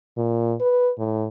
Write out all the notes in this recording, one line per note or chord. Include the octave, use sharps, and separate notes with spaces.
A#2
B4
A2